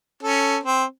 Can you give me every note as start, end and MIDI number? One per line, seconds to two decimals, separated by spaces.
0.23 0.57 61
0.23 0.57 69
0.63 0.84 60